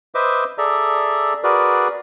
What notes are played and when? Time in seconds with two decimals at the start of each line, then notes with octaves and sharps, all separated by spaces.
0.15 B4 C5 D#5 E5 D6
0.58 G#4 A4 D5 E5 A#5
1.44 F#4 G#4 A#4 B4 D5